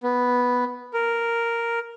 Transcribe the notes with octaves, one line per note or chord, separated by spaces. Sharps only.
B3
A#4